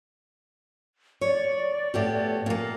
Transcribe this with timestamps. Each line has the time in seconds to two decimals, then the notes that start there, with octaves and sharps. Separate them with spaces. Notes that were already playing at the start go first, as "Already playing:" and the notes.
1.21 C#5 D5
1.94 A2 B3 G4
2.46 A#2 A#3